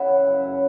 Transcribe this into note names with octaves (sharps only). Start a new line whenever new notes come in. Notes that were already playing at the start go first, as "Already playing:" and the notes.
Already playing: C#3 E4 E5 F#5
E3
F#2
C#3